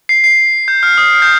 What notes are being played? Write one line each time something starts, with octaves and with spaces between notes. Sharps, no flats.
C7
C7
G6
F6
D#6
F6
G6